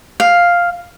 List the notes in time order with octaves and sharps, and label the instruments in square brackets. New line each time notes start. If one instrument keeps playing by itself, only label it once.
[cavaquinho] F5